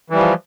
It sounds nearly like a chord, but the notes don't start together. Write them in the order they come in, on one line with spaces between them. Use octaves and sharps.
E3 G3 F3